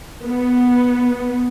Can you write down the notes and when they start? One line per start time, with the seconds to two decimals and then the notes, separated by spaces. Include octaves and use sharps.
0.25 B3